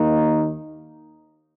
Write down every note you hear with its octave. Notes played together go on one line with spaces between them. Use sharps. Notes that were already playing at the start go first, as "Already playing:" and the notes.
Already playing: D#2 D#3 A#3 D#4